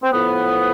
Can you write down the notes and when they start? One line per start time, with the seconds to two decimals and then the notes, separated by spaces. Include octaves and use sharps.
0.03 C4
0.12 A2 F3 B3